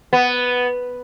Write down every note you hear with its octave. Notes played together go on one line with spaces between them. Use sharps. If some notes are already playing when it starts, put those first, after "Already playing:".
B3